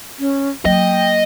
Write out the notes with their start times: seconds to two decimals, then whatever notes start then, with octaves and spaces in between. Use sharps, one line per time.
0.19 C#4
0.65 F#3 A#3 D#5 G5